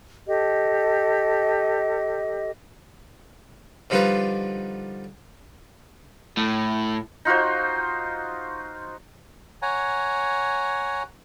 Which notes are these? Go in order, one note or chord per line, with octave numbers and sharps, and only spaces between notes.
G4 A4 D#5
D3 F3 G3 D#4 F4 B4
A2
D#4 F4 F#4 C5
C#5 F#5 G#5 A#5